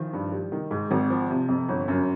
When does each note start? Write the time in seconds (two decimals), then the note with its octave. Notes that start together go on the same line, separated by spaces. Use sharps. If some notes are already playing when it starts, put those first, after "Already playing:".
Already playing: D#3 F3
0.13 G2
0.32 G3
0.52 D#3
0.71 G#2
0.91 G#1
1.10 F3
1.30 C3
1.49 F2
1.68 G1
1.88 F#2